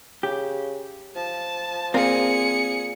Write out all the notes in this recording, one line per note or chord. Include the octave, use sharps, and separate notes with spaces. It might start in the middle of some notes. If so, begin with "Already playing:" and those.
C#3 G4
F3 A5
A#2 C4 G#4 A#4 C#7